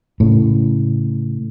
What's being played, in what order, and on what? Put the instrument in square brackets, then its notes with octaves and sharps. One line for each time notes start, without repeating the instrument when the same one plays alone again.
[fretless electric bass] A2 C#3